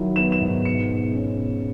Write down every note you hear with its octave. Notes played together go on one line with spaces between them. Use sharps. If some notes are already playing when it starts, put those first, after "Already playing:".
Already playing: D#3 F#3 E4
B3 E7
E7
G#2
B2 C#7
G#3
C#4
B2